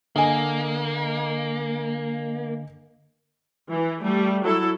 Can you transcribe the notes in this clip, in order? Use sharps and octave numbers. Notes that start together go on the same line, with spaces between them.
D3 A#3 D#5 G#5
E3
G3 A3
F#3 E4 A4